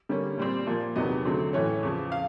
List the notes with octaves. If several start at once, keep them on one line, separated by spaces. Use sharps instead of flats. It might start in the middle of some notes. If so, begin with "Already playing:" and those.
D3 G3 A#3 C#4
A#2 G3 C4
A#2 F3 A#3
E2 C3 D#3 F#3 B3 D#5
D3 F#3 A3 C4
A2 E3 A3 C#4 C#5
E2 C#3 F3
F5